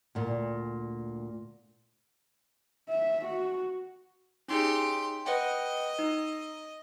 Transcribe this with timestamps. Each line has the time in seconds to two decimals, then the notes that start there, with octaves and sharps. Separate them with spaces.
0.15 D2 A#2
2.89 E5
3.25 F#4
4.48 C#4 D#4 G4 G#4 C6
5.25 B4 D#5 F#5 G5
5.99 D#4